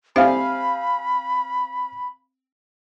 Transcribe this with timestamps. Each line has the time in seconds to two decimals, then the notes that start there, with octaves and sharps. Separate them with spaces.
0.16 C4 G4 C5 E5 F5 G#5 B5